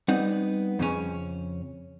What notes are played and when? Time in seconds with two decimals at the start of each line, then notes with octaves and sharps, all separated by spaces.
0.08 G3 B3 C4 D#4 F#5
0.79 F2 C#3 C#4